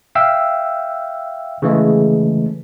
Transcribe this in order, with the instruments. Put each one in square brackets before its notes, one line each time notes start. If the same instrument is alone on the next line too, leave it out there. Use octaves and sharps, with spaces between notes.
[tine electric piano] E5 F5 G5 E6
C#3 E3 G#3 A3